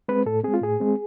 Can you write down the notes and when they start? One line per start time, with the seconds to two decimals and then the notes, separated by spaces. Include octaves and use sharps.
0.08 G#3 C4 B4
0.26 A2 A4
0.44 G#3 C4 G#4
0.54 F4
0.62 A2 G#4
0.80 G#3 C4